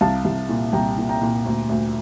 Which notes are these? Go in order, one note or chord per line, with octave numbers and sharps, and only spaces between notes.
C2 F5 A5
C2
A#2
C2 G5 A#5
A#2
G5 A#5
A#2
D2
D2